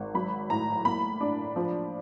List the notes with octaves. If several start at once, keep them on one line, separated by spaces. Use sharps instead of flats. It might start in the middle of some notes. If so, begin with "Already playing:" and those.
Already playing: G#1
F#3 B5
A2 A#5
A#3 B5
D4
F3